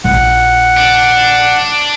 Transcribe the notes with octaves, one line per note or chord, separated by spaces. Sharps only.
A#1 F#5
D4